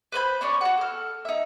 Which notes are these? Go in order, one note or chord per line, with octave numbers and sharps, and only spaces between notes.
B4 C5 B5 G6
C#4 D4 C#5 D5
F#4 F#5
A4 F6
D#4 E5